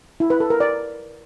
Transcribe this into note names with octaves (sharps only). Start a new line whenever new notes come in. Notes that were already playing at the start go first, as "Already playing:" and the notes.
E4
B4
A4
A#4
D5